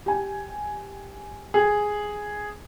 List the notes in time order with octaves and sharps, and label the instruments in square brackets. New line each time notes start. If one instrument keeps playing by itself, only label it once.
[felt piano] G4 G#5
[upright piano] G#4